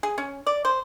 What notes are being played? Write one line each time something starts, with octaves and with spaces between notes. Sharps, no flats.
G#4
C#4
D5
C5